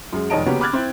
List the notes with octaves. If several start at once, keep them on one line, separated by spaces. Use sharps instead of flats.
F#2 G#3
F1 D#3 C#5 D#5 A5 D7
C#3 A#3 B3 C#4 F#4 G4
B5 D6 F6 F#6 G#6 A6
C4 E4